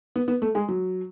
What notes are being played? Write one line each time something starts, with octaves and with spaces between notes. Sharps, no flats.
B3
B3
A3
G#3
F#3